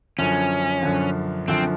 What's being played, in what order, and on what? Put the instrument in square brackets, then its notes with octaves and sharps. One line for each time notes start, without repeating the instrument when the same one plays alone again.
[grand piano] F#2 D3 F3 [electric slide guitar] C#4
[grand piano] F#2 D3 F3
[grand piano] F#2 D3 F3 [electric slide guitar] C4